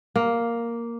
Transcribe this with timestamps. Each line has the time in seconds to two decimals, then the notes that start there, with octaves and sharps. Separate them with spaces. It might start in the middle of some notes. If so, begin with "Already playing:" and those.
0.16 A#3